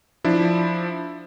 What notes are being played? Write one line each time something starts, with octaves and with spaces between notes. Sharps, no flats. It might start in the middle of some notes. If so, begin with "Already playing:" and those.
F3 D4 E4